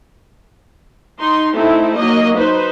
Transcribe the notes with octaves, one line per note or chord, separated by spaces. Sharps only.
D#4 C6
A3 C4 D#4 E4
F#3 A#3 D#5
D#4 B4 C5